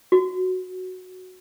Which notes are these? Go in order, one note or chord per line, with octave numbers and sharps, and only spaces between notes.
F#4